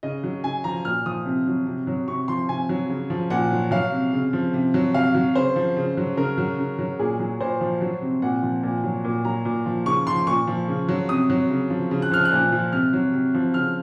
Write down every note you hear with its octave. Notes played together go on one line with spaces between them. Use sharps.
C#3 D#5
F#3
C#3 G#5
F3 A#5
A#2 F6
F3 D#6
C3
F#3
C3
F#3
C3 C#6
F3 C6
C3 G#5
F#3
C#3
F3
A#2 F#5
F#3
F#3 F5
C3
C#3
F3
C3
F#3
C3 F5
F#3
C#3 C5
F3
C#3
F#3
C#3 A#4
F#3
C#3
F#3
A#2 G#4
F#3
A#2 C5
F3
F#3
C3
A#2 F#5
F3
A#2
F#3
A#2
F#3 A#5
A#2
F3
C#3 C#6
F3 C6
A#2 C#6
F3
C#3
F#3
C3 D#6
F#3
C#3
F3
C#3
F#6
F3 F6
F#6
A#2
F3
C3 F6
F#3
C3
F3
C#3 F6